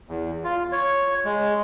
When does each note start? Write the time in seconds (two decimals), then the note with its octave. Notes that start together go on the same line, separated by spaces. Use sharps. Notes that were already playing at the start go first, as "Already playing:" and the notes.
0.09 E2
0.44 F4
0.72 C#5
1.25 G#3